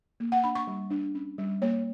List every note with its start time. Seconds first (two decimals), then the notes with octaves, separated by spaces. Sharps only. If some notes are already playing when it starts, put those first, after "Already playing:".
0.20 A#3
0.32 F#5
0.44 D4 B5
0.55 C#6
0.67 G3
0.90 D4
1.15 C#4
1.38 G3
1.62 A#3 C#5